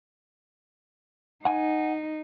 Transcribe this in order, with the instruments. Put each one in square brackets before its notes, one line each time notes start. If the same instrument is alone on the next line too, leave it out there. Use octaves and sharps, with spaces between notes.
[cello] D#4 [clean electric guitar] F#5 G#5